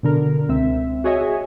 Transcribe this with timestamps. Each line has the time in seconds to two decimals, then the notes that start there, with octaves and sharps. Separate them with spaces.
0.03 B2 D3 A#4
0.48 C#2 C4 E5
1.04 F#4 G#4 C#5 D#5 E5 G#5